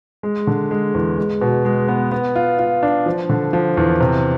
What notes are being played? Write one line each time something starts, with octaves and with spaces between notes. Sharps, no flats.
G#3
D3
G#3
E2
G#3
B2
G#3
B3
B3
F4
F4
D4
F3
D3
F3
E2
C3